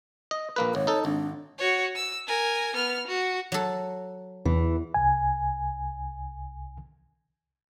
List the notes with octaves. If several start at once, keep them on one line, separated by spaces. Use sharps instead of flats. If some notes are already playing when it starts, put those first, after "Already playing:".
D#5
A#1 A#3 B4
G#1 C#5
D#4 A4
G#1 D4
F#4 C#5
E6
A#4 G#5
B3 F6
F#4
F#3 A4
E2 E3
C2 G#5